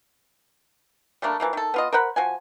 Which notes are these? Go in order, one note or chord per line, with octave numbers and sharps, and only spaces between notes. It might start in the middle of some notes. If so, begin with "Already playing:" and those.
G3 A3 A#3 D4
E3 F3 A#3
D#3 A4
B3 F4 D#5
A#4 C5 F#5 B5
F3 F#4 G#5